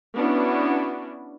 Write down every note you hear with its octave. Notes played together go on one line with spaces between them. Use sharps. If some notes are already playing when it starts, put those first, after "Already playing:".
B3 C#4 D4 E4 F#4